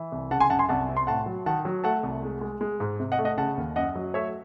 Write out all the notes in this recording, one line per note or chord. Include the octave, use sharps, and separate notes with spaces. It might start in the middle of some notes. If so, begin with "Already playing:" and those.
Already playing: E3
C2
C#3 F#5 A5
G#5 C6
F#2 F#5 A5
G#5 C6
C2 F#5 A5
C3
C6
A2 F#5 A5
F#3
D#3 F#5 A5
F#3
A3 F#5 A5
C2
G#3
G#3
G#3
G#2
C3
D#5 F#5
A3
D#5 F#5
C#3 F#5 A5
D#2
F#2 D#5 F#5
F#3
A3 C#5 E5